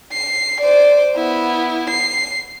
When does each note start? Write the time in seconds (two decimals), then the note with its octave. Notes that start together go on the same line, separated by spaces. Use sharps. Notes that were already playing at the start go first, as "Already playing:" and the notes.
0.12 C7
0.61 C5 D5
1.16 B3 E4
1.90 C7